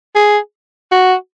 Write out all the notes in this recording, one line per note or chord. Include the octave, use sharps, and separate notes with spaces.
G#4
F#4